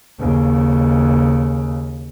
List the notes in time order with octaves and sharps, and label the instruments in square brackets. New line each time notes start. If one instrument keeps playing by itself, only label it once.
[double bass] D#2 C#3